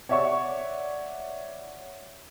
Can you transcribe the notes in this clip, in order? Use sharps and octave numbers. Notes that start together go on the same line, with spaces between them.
C#5 D5 E5 F#5 C#6